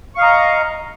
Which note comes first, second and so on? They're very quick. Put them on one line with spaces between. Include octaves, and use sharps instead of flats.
C#6 F5 D#5 A#5